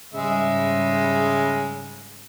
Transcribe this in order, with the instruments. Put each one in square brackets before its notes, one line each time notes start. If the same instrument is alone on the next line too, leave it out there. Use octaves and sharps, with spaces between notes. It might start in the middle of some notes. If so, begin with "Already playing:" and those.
[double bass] G#2 G3 [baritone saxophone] C#3 [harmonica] G#3 E5